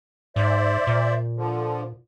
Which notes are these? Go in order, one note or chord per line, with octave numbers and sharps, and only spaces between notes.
G#2 C5 D5 E5
A#2
D3 F3